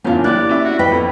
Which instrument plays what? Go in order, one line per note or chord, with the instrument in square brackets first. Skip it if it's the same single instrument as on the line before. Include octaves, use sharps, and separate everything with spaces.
[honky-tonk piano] F#1 E2 F4 [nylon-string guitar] C#4 D4
[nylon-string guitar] A#3 E4 G4 [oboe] D5 [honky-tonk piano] F#6
[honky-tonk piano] C#4 E5
[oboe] F#4
[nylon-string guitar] B4 D#5 G5 [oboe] B5
[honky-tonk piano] F2